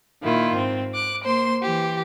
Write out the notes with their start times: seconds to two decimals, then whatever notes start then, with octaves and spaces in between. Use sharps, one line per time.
0.23 A#2 D#3 E4 F4
0.55 G#2 C4
0.94 D6 F#6
1.23 A#3 C5 C6
1.62 E3 G4